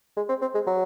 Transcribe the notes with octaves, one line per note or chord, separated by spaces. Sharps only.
G#3
C4
C4
G#3
F#3